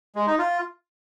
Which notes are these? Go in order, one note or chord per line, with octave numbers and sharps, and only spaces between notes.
G#3
D#4
F4